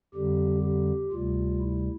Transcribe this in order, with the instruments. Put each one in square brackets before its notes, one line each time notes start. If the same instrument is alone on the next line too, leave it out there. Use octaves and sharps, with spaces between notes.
[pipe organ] F2 D3 G3 G4
G4
D2 C3 G3 F4
E4